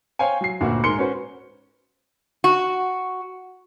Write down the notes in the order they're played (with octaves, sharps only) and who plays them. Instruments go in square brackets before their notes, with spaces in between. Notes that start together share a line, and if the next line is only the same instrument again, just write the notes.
[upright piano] C5 C#5 F5 G5 G#5
F#3 C7
G1 D2 A#2 F#4
G#2 G#3 A#4 C6 C#7 G7
C#4 F#4 B4 C5
[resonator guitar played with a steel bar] F#4